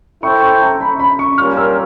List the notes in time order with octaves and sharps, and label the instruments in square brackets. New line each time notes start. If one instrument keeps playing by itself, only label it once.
[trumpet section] E4 A4 C5 E5 G5 [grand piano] C#6
[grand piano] C#6
A#5
B5
B5
C#6
[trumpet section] G3 A#3 C#4 F4 A#4 [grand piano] F6
[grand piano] E6